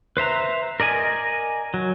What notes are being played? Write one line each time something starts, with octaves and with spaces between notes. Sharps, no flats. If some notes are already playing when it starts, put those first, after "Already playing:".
B4 C5 E5 A#5
A#4 D5 D#5 G#5
F#3